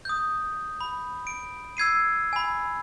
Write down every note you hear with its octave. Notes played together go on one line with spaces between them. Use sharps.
D#6 G6
B5
D7
E6 G#6 C7 D#7
G#5 B5